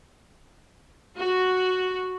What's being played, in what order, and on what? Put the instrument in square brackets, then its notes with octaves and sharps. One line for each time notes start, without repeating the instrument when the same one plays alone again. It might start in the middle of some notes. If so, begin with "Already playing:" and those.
[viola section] F#4